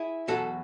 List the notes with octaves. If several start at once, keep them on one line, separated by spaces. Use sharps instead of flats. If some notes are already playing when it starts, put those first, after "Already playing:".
Already playing: E4 G#4
E2 B2 F#3 F#4 A4